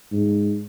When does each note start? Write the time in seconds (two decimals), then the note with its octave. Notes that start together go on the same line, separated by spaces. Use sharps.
0.12 G#2